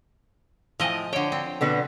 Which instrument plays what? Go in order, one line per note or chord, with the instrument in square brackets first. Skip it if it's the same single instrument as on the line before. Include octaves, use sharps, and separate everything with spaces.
[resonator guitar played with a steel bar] A2 G#5 [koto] F3 D#5
[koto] D3 G5 [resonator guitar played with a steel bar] C#5
[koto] C4
[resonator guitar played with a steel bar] B2 D3 B3